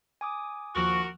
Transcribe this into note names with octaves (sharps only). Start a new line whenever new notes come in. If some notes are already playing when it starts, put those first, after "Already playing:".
G#5 D6 D#6
D#2 F3 F#4 A#4 C#6